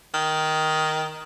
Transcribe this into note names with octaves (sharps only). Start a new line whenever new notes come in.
D#3